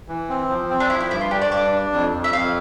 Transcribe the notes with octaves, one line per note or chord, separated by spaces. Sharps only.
E3
C4
F3
C4
D4
F3 E4
E4
G2 E4
F4
D4 G4
D5
G2 D5
D4
F2
F2
E5
F2 F5